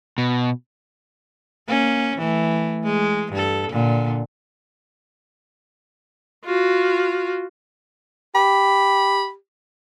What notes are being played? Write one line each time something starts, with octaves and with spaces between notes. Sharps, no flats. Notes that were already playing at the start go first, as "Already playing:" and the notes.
B2
A#3 C#4
E3 A3
G#3
G2 A4
A#2 D3
F4 F#4
G4 B5